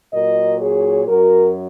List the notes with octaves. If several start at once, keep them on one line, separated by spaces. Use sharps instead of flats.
A#2 F#3 A#4 D#5
G#4 C#5
F#2 F#3 F#4 A#4